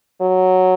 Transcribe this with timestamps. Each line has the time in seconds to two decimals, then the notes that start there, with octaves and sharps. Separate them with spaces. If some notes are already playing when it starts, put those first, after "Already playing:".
0.21 F#3